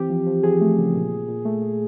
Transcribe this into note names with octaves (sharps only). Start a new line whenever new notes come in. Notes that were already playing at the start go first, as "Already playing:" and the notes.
Already playing: E3 C4 G4
F3
F3
F3 G#4
A3
C#3
A#2
A#2
A#2
A3
A3